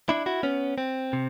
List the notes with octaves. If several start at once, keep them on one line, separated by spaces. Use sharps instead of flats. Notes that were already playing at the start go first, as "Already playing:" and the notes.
D4 E4
E4 F#4
B3 C#4
C4
C3